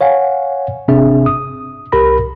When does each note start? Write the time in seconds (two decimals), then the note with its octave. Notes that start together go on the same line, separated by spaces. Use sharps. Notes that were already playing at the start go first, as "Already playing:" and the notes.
0.01 C#5 F5 F#5 G#5
0.88 G#1 C3 C4 D4 G#4 E5
1.26 D#6
1.92 C2 G4 A#4 B5 A#6